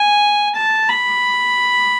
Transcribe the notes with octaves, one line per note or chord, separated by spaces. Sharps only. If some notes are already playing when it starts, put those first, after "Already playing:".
Already playing: G#5
A5
B5